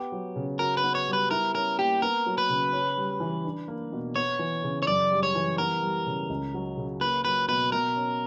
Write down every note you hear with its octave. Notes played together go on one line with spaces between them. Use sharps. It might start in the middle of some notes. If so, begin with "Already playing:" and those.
Already playing: B3 G4
F#3
C#3
F#4 A#4
B4
B3
C#5
G3
B4
E4 A#4
C#4 A#4
A#3 G4
B3 A#4
F#3
B4
C#3
C#4
G3
E3
D4
A#3
B2
B3 C#5
E3
C#3
C#5
F#2 D5
G3
C#5
E3
B3 A#4
G3
C#3
C#2
F#3
C#3
A#3 B4
F#3 B4
B2 B4
B2 A#4
C#4